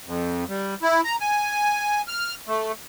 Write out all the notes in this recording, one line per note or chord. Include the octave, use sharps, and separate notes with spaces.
F2
G3
E4
A#5
G#5
F6
A3